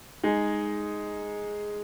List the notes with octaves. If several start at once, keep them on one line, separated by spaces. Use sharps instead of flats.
G#3 D#4 G#4